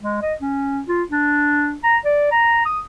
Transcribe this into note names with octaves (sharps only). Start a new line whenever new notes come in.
G#3
D#5
C#4
F4
D4
A#5
D5
A#5
D#6